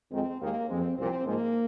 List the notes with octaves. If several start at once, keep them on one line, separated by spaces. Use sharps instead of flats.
F2 D#3 G#3 C4
D#2 D#3 G#3 A#3
F2 F3 G#3 C4
C2 A#2 F3 C4
G#2 F3 G#3 A#3